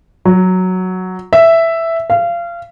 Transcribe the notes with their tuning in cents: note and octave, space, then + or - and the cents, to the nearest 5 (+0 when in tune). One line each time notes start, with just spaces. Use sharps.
F#3 +0
E5 +5
F5 -25